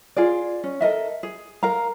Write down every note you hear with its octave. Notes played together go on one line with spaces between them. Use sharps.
F4 G#4 D5
C#4
A4 A#4 D#5 E5
G#4
A#4 F5 A#5